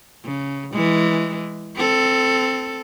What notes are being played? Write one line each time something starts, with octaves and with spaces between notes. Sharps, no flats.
C#3
E3 G#3
C4 A4